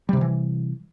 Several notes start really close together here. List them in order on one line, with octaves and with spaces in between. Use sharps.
G3 C3 D#3 E3